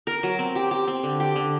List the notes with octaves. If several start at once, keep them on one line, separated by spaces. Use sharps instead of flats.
A#4
F#3
C4
G4
G4
C4
D3
G4
D3